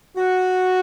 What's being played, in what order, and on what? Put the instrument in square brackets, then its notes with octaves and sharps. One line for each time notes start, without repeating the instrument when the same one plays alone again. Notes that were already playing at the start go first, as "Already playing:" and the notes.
[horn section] F#4